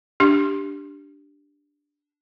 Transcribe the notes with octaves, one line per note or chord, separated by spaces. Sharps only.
D4 G4